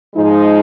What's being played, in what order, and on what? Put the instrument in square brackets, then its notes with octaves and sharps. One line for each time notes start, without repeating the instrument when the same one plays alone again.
[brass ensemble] G#2 F3 G#3 D#4